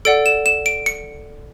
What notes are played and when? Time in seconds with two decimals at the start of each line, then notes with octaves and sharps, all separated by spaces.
0.05 A4 D5 F#5 D7
0.26 E7
0.46 E7
0.66 D7
0.86 C#7